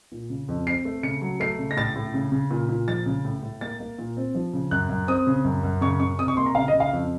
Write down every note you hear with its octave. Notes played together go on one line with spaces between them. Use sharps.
A#2
C#3
F2
C4 C7
A3
C#3 C#7
F#3
A3 C7
C#3
A#6
A2 A6
A2
C#3
C#3
A#2
A#2
F3 A6
C#3
A2
A2
A#3 A6
A#3
A#2
C4
F3
C#3
F#2 F#6
F#2
C4 D#6
C#3
F#2
F#2
C#3 C#6
C#3 C#6
C3 D#6
C#6
A#3 C6
A#5
C#3 F5
D#5
C#3
F5
F2